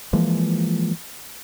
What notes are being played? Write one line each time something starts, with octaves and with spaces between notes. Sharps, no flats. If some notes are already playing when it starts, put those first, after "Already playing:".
E3 F3 G#3 A#3